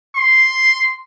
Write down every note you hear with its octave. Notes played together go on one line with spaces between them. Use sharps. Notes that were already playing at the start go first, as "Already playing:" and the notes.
C6